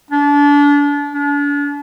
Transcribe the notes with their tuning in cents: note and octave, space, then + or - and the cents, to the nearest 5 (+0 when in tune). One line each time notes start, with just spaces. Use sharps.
D4 -30
D4 -40